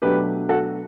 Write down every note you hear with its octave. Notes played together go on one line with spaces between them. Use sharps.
B2 F#3 A3 D4 G4 B4
F#4 A4